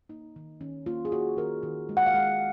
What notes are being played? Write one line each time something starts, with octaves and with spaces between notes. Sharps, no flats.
A#3 D#4
D#3
D#3 C#4
A#3 F4
G#4
A#3 F#4
D#3 A#4
D#3
G#3
F#5
F5
G#3 F#5